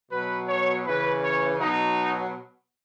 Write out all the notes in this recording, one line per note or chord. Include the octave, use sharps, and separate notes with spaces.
B2 F#3 B4
C#5
C#3 E3 B4
C#5
B2 F#3 D#4